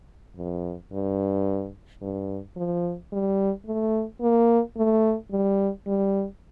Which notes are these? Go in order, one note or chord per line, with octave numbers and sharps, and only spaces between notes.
F2
G2
G2
F3
G3
A3
A#3
A3
G3
G3